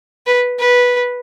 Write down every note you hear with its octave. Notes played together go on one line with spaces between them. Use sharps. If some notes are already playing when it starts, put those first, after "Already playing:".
B4
B4